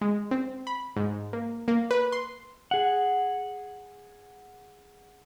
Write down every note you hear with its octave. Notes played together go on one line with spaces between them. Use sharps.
G#3
C4
B5
G#2
A#3
A#3
B4
C6
G#4 F#5